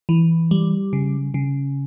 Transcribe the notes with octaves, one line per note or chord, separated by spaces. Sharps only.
E3
G3
C#3
C#3